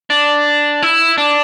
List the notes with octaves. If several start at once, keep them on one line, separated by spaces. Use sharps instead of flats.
D4
E4
D4